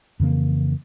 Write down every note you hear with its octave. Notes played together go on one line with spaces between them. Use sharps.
F2 C#3 E3 A#3